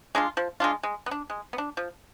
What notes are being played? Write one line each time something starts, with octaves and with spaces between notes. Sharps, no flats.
G#3 D4 F4
F3
G#3 D4 F4
G#3
B3
D4
G#3
B3
D4
F3